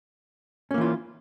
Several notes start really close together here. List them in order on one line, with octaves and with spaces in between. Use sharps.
C#4 A#3 E3 F4